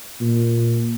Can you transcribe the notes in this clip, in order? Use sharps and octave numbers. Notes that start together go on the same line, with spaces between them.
A#2